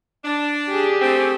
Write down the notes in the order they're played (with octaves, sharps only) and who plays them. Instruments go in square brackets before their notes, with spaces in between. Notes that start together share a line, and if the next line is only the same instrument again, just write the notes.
[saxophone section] D4
[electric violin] G4 G#4
[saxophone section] A3 C4